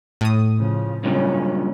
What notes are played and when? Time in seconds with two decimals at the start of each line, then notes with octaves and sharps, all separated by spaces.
0.21 A2 D#6
0.58 C#3 F3
1.04 G2 A#2 C#3 F#3 C#4